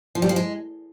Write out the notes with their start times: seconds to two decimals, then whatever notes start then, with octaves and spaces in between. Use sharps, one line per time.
0.15 F3
0.22 G3
0.29 F3
0.36 G#3